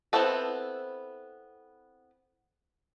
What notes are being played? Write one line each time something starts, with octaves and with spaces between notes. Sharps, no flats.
B3 C4 E4 F#4 A4